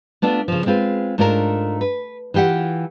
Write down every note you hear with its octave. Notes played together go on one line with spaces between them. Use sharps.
A3 B3 D4 F4
C#3 F3
G#3 C4 F4 B4
G#2 A3 D4 F4 A4 A#4
B4
E3 F4 G4 E5 F#5